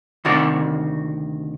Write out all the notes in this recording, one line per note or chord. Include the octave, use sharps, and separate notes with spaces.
D2 C3 D#3 F#4 D5